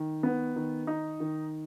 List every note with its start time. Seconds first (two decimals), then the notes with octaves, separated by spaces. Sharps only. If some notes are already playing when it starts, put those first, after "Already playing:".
Already playing: D#3
0.23 B3
0.56 D#3
0.87 D#4
1.20 D#3